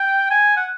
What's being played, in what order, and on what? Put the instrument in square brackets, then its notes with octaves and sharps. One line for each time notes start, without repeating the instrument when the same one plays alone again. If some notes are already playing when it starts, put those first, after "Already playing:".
Already playing: [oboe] G5
G#5
F#5